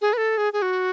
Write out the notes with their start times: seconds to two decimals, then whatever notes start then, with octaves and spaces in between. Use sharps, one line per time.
0.01 G#4
0.13 B4
0.17 A4
0.38 G#4
0.53 G#4
0.62 F#4